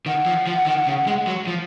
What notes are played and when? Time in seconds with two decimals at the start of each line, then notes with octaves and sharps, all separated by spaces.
0.06 D#3 F#5
0.26 F3
0.47 F3
0.66 D#3
0.87 C#3
1.07 G#3
1.27 F#3
1.47 F3